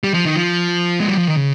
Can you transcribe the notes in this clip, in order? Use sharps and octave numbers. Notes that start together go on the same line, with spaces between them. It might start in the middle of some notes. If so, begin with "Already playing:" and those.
G3
F3
D#3
F3
G#3
G3
F3
D#3
C#3